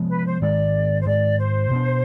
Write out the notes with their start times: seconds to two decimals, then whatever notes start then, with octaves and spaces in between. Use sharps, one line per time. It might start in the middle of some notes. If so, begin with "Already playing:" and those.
Already playing: C3 F3 G#3 B3
0.08 B4
0.25 C5
0.41 G#2 D#3 G#3 D5
1.00 C5
1.06 G#2 D#3 G#3 D5
1.38 C5
1.71 B2 B3 D4